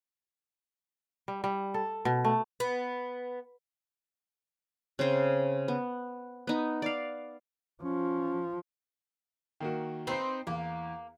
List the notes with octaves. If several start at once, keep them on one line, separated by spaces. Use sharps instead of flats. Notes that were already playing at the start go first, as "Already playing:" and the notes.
G3
G3
A4
B2
A3
B3
C#3 C4 C5
B3
B3 D#4
D5 F5
F3 C#4
D#3 A#3 F#4
C4 D#4 B4 C5 C7
E2 A#3